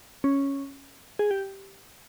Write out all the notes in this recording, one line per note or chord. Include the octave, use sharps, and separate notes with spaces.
C#4
G#4
G4